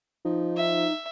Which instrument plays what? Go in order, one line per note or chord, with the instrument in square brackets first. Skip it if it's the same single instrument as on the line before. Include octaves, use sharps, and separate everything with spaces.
[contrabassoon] F3 [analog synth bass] D#4
[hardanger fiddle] E5